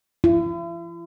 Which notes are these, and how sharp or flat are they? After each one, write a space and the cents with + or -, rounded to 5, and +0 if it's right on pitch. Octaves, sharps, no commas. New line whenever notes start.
E4 +45